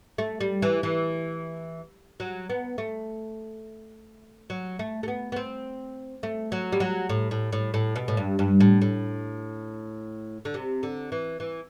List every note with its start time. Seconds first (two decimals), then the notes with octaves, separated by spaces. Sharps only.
0.18 A3
0.41 G3
0.62 E3
0.83 E3
2.20 F#3
2.50 B3
2.78 A3
4.50 F#3
4.79 A3
5.03 A3
5.08 B3
5.32 B3
5.36 C4
6.23 A3
6.52 F#3
6.72 G3
6.80 F#3
7.09 A2
7.31 A2
7.53 A2
7.74 A2
7.96 B2
8.08 A2
8.17 G2
8.39 G2
8.60 A2
8.82 A2
10.45 D3
10.54 C3
10.83 D3
11.12 E3
11.40 E3